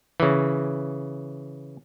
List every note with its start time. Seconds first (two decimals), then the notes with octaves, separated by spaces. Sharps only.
0.20 C#3 E3